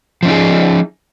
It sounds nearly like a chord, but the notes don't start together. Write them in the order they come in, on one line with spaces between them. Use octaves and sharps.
F3 C#4 D#4 G#4